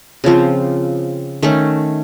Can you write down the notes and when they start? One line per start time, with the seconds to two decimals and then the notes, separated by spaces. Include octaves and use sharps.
0.24 C#3 F3 C4
1.42 D#3 A3 C#4